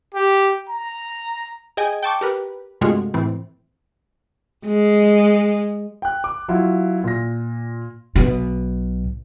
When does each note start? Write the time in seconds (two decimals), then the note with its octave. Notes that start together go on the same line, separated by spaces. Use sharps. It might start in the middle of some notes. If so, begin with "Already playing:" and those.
0.14 G4
0.69 A#5
1.77 G#4 D#5 G5 G#5
2.03 G5 A5 C#6 D6
2.21 G4 A#4 B4
2.81 G2 C3 G#3 A3 F4 F#4
3.14 A2 E3 C4
4.65 G#3
6.02 G5 F#6
6.24 D6
6.48 F#3 E4 F4
7.04 A#2 A#6
8.16 B1 B2